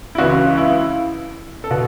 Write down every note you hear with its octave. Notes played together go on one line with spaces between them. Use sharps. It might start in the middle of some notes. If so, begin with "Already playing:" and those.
E4
C#2 C#3 E3 F#4
E4
A4
B2 F#4